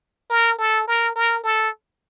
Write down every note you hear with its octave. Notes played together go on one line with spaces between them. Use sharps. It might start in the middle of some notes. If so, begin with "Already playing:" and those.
A#4
A4
A#4
A#4
A4